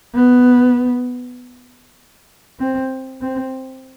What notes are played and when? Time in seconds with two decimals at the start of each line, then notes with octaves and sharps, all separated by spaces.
0.15 B3
2.60 C4
3.21 C4